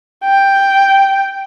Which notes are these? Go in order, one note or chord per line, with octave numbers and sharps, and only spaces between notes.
G5